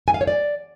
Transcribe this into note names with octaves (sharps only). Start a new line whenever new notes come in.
G#5
F5
C#5
D5